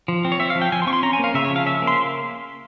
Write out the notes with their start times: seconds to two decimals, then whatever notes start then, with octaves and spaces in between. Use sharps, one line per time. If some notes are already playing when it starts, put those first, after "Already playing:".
0.08 F3
0.25 C4
0.32 C#5
0.40 C4 E5
0.50 F5
0.55 F3
0.62 G5
0.72 F3 G#5
0.82 C6
0.87 C4 C#6
0.93 C6
1.03 C#4 A#5
1.13 G#5
1.19 A#3 F5
1.34 C#3 E5
1.45 C#5
1.50 F3
1.56 F5
1.66 C#4 E5
1.82 A#3
1.87 C6